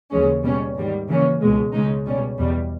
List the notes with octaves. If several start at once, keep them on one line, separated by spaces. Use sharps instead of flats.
D#2 C#3 E3 G#3 C#4
B2 G3 C#4
G#2 D#3 G3
C#3 E3 A#3 C#4
C#2 B2 G#3
C#3 G#3 D#4
B2 G3 C#4
E2 B2 G3